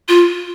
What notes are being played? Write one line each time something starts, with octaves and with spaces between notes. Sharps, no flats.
F4